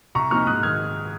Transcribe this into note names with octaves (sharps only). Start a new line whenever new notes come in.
C2 A#5 C#6
A#2 F3 C4 D#4 C#6 F6
G#2 D#6 F#6
D#3 F6 G#6